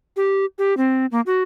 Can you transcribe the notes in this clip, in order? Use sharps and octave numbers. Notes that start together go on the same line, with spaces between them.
G4
G4
C4
A#3
F#4